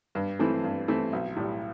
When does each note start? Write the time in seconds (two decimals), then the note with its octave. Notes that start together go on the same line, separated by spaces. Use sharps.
0.15 G2
0.39 E3 A3 C4 E4
0.64 G2
0.88 E3 A3 C4 E4
1.13 B1
1.36 A2 G3